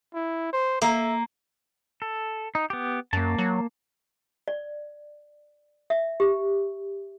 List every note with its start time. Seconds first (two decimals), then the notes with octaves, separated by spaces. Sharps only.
0.14 E4
0.53 C5
0.82 A#3 E5
2.02 A4
2.55 D#4
2.70 B3 G4
3.13 F#2 A#3 A5
3.38 F#3
4.48 D5
5.90 E5
6.20 G4